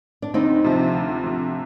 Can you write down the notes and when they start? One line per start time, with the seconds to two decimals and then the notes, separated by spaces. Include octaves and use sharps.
0.22 D4
0.34 D2 C4 D#4
0.64 C3 F3
0.94 D2
1.24 C3 F3